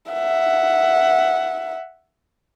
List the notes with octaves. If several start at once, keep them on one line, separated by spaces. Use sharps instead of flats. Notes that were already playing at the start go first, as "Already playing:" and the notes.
E5 F#5